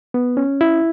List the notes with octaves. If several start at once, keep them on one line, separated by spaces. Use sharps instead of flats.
B3
C#4
E4